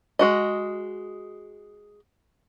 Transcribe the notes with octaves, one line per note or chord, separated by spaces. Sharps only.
G#3 F#4 D#5